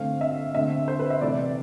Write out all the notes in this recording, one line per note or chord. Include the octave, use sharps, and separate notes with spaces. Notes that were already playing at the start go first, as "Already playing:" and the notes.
Already playing: D3 A3 C4 F5
E5
D3 A3 C4 E5
C5
B4
E5
C3 E3 A3 D5